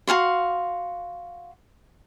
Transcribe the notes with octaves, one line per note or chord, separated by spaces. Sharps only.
F#4 A4 F5 C6